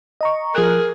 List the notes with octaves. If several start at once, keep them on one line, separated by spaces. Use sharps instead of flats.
D#5 A#5 C#6
F3 G#4 A#4 F#6